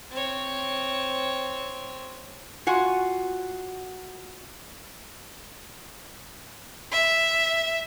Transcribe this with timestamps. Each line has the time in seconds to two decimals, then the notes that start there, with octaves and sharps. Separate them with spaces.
0.11 C4 C#5
2.67 F4 F#4 F#5 G#5
6.92 E5